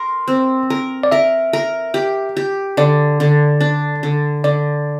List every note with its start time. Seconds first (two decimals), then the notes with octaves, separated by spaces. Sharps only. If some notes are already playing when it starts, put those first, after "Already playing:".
Already playing: A#4 C6
0.28 C4
0.70 A#4
1.03 D5
1.12 A#4 E5
1.53 A#4
1.94 G4
2.37 G4
2.77 D3 D5
3.20 D3
3.60 D4
4.03 D3
4.44 D3 D5